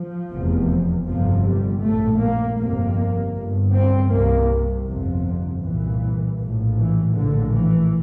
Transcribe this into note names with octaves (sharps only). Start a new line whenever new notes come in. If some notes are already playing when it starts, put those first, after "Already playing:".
Already playing: F3
F1 E2 C3
G1 F2 C3 F3
G3
A#1 A2 A3
A#3
G1 F2 C3 A#3
G1 G2
C4
C2 C3 A#3
G1 F2 C3
C2 A#2 E3
A#1
A2
E3
A#1 A2 D3
E3